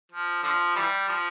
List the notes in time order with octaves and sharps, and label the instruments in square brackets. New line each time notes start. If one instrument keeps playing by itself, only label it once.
[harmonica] F3
D3 F3
E3 G3
F3